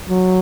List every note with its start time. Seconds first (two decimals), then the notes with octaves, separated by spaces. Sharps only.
0.09 F#3